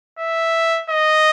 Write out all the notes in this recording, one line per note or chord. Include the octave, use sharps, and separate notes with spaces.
E5
D#5